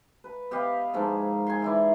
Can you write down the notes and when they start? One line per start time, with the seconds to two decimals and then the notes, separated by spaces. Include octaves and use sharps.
0.24 B4
0.51 B3 G4 D#5 F5
0.93 G#2 F3 A#3 G#4
1.47 G#5 C6
1.62 E3 E4 D5